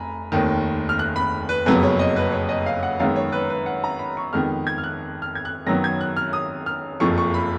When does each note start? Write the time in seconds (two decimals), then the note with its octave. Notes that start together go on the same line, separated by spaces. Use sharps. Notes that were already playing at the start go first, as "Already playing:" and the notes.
Already playing: F1 G#5 A#5 B5
0.32 F1 D#2 D#3
0.89 F6
0.99 F#6
1.16 B5
1.49 B4
1.66 F#1 F2 C#3 F#3 B3 B4
1.83 C#5
1.99 D#5
2.16 B4
2.32 C#5
2.49 D#5
2.66 F5
2.83 F#5
2.99 F#2 D#3 G#3 B3 F5
3.16 C#5
3.32 B4
3.50 B4
3.66 F#5
3.84 A#5
3.99 B5
4.17 C#6
4.33 F2 D#3 G#3 B3 F6
4.67 G#6
4.78 F6
4.84 F#6
5.22 F6
5.35 G#6
5.45 F#6
5.67 F#2 D#3 F#3 B3 A#6
5.84 G#6
6.01 F#6
6.17 F6
6.33 D#6
6.66 F6
7.00 F#1 F2 F3 C#6
7.18 C#6
7.34 B5